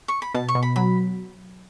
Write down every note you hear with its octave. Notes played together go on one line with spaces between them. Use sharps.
C#6
B5
B2 A5
C#6
B2
B5
F#3 B5